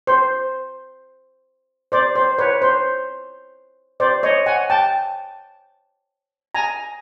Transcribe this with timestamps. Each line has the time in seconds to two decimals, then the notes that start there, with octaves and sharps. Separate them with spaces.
0.07 C5
1.92 C5 D5
2.15 C5
2.38 B4 C#5
2.62 C5
4.00 C5 D5
4.23 C#5 D#5
4.46 F#5 G#5
4.70 G5 A5
6.55 G#5 A#5